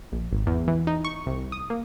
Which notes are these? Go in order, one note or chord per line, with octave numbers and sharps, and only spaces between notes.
A#1
G#1
E2
E3
D#4
C#6
C2
D#6
A#3